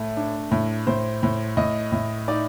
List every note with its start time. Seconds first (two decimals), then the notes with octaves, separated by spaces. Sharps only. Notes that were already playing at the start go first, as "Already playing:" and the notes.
Already playing: A2 A3
0.17 D4
0.51 A2
0.87 A2 C5
1.23 A2
1.57 A2 D#5
1.92 A2
2.28 D#4 D5